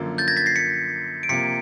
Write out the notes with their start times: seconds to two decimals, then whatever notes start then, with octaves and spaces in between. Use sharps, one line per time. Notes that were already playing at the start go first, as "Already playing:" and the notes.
Already playing: F#2 D3 F3 A#3
0.18 G6 A6
0.28 G#6 A#6
0.37 A6 B6
0.46 A#6 C7
0.56 B6 C#7
1.23 D7
1.29 C3 F3 A#3 B6 C#7